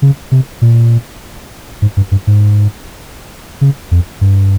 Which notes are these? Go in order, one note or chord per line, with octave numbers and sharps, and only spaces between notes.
C#3
C3
A#2
G#2
G2
G2
G#2
C#3
F2
G2